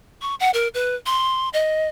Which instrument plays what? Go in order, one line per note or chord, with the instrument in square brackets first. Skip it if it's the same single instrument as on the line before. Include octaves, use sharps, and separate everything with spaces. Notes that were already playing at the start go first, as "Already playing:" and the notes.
[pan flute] C#6
F#5
A#4
B4
C6
D#5